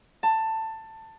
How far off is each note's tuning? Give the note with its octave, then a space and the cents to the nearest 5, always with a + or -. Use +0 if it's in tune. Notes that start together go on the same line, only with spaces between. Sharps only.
A5 +15